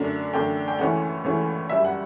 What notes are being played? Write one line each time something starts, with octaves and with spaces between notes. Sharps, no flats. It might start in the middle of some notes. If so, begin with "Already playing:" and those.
Already playing: F#2 D3 A3 D4
F#2 D3 A3 D4 G5
G5
C#2 C#3 E3 A3 C#4 F#5
C#2 C#3 E3 A3 C#4
F#2 C#3 G3 E5
F#5